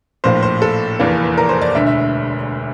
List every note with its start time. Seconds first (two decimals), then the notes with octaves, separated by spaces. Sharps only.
0.24 A#1 A2 F3 A#3 C5
0.43 C5
0.62 A4
0.99 F1 E2 E3 A#3
1.38 A#4
1.49 C5
1.61 D5
1.74 E1 D2 D3 E5
1.87 E5